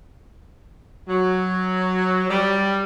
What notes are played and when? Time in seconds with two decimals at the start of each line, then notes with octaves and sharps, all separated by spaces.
1.09 F#3
2.30 G3